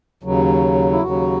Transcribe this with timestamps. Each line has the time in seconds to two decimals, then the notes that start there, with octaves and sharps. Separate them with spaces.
0.23 D#2 C#3 F#3
0.92 E4
1.02 D#2 C#3 F#3 F#4